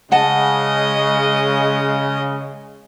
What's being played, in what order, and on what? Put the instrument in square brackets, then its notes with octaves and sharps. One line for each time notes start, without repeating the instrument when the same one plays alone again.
[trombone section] C#3 [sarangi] G#3 [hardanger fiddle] D#5 [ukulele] F#5 A5